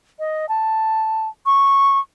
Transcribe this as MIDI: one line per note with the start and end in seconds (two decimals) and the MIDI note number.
0.19 0.46 75
0.49 1.28 81
1.46 1.99 85